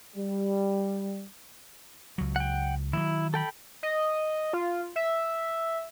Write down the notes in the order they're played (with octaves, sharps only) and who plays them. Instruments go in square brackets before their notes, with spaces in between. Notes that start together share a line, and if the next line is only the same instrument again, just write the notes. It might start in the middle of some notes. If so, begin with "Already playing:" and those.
[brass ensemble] G3
[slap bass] C#2 F#3
[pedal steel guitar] F#5 G5
[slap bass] D#3 F3 F#3 [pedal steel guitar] E4
[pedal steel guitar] A4 G5 B5
[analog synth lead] D#5
F4
E5